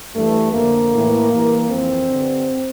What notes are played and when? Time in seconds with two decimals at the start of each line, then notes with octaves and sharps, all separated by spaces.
0.15 G2 E3 A3
0.53 F2 D3 A#3
0.92 A2 E3
1.31 G2 E3
1.70 F2 E3 C4
2.08 G2 D3